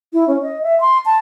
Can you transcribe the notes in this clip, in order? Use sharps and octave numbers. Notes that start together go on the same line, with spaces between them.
E4
C#4
D#5
E5
C6
A5